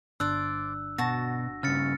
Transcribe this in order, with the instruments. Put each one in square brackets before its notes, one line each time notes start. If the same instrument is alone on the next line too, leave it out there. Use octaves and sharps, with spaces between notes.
[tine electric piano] G1 D4 F#6 [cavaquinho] C5 D5 [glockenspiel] E6
[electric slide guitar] B2 [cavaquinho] F#4 A5 [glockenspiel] A#6
[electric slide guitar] G2 C#3 [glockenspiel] F6 A6 C#7